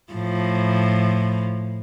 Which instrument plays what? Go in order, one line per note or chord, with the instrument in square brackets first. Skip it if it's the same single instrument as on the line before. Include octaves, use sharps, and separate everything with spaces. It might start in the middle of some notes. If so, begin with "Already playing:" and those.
[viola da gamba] A2 F3